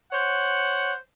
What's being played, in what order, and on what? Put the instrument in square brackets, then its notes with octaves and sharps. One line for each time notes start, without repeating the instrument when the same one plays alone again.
[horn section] C5 C#5 F#5